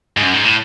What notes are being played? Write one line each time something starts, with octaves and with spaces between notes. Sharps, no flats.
G#2
F#2
G#2
A2